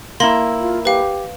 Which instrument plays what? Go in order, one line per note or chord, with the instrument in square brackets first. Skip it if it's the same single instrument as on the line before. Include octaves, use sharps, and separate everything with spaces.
[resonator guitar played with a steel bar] A#3 E4 [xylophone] C6 A#6 F#7
[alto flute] F4
[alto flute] G4 [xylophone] B4 F5